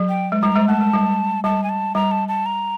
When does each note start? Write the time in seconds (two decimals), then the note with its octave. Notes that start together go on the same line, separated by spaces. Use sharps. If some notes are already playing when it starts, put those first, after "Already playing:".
Already playing: F#3
0.09 G5
0.32 G#3
0.42 G3 A#5
0.55 G#3
0.68 A3 A5
0.81 G#3
0.93 G3
1.44 G3 A5
1.63 G#5
1.69 A5
1.95 G3 A#5
2.11 A5
2.28 A5
2.46 A#5